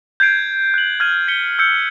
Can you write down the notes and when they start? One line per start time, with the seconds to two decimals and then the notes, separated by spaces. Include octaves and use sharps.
0.20 G6 G#6 C7 D7
0.74 F#6 F#7
1.00 F6 G#6 D#7
1.28 B6 C#7 G7
1.59 E6 G6 C#7